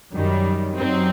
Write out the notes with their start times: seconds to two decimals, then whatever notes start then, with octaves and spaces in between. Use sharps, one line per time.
0.13 F#2 D#3 G3
0.76 F#2 F#3 C4 D#4